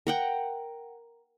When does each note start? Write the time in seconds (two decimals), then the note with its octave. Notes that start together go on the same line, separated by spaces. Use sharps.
0.07 A#4 F#5 G5